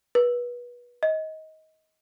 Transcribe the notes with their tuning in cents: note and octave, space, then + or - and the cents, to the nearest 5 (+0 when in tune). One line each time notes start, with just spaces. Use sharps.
B4 -25
D#5 +20